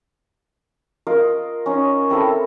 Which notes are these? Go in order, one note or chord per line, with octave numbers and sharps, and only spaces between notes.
F4 A#4 D#5
C#4 D#4
C4 E4 A4 A#4